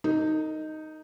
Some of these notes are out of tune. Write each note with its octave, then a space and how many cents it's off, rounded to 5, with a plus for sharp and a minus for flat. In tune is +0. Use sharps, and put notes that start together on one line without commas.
D#4 +0 A#4 -45